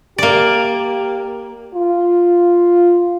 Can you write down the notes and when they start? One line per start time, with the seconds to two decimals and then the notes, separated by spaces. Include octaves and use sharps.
0.18 A#3 G4 D5
1.74 F4